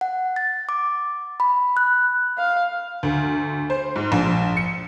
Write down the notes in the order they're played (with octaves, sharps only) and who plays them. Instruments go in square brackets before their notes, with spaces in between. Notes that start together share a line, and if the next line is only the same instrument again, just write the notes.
[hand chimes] F#5
A6
D6
B5
F#6
[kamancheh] F5
[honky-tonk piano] D2
C5
G#2
A#1
C#7